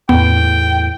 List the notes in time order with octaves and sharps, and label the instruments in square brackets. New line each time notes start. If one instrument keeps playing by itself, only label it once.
[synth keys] E2 A2 [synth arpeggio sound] B3 [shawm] G5